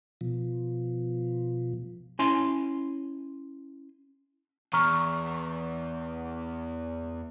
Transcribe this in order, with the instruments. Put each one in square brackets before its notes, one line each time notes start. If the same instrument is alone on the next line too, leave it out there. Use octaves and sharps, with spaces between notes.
[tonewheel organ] B2 F3
[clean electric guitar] C#4 E4 G#5 C6
[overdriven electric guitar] E2 [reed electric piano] A#5 C#6 F6